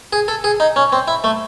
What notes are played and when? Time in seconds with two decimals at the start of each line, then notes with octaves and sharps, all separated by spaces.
0.13 G#4
0.28 A4
0.44 G#4
0.60 D#4
0.76 C#4
0.92 C4
1.08 E4
1.24 A3